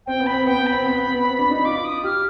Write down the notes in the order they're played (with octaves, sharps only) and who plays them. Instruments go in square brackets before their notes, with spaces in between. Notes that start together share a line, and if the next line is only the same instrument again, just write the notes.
[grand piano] C4 [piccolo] G5
[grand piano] B3
[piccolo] B5
[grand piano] C4
[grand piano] B3 [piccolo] G5
[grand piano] B3
[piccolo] B5
[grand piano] C4
B3
B3
B3
C4
D4
D#4
[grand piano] F4 [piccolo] D6
[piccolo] D#6
[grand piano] G4 [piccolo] F6